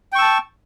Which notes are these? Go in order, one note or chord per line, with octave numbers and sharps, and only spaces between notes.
G5 A5 C#6 E6